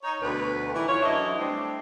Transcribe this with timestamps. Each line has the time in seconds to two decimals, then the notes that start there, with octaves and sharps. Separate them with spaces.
0.03 D#4 C#5
0.20 D2 B2 B4
0.73 D#3 E3 G3 E4
0.86 F4 C#5
1.01 F#2 D3 E3 D4 E4 D#5
1.37 G3 A3 C4 D4